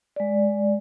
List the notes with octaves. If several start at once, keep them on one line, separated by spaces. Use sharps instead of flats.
G#3 D5